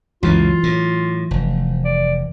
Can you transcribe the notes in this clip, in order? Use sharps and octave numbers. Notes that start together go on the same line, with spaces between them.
C#2 F#2 C#3 E3 F#3 F4
A2
F1
D5